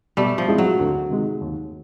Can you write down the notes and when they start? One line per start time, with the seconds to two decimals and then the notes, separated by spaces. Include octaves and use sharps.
0.17 B2 G3 A3
0.38 F3
0.48 G#3 C4 E4 G#4
0.58 F#3
0.79 D2
1.09 C3 D#3 G#3
1.41 D#2